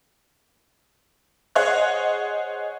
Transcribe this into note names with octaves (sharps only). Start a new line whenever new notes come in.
G#4 C5 C#5 D#5 F#5 F#6